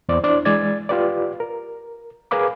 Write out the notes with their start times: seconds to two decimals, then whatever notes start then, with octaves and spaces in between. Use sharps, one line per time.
0.09 E2 C5 D5
0.24 D4 E4 C5 D5
0.45 E3 G#3 D5 G#6 A6
0.89 F4 G4 B4 D5
1.40 A#4
2.31 G#4 A#4 B4 F5 B5 D6